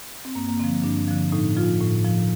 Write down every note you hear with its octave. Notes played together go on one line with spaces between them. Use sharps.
C4
G2 A#3
A#3
D3 F3 C4
G2 D4
D3 F3
A2 D#4
F3 F4
A2
F3